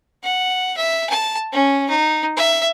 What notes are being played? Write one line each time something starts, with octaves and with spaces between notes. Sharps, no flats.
F#5
E5
A5
C#4
D#4
E5